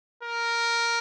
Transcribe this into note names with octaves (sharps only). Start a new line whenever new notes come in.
A#4